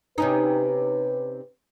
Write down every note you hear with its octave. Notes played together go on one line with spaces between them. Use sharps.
C3 C#4 D#4 B4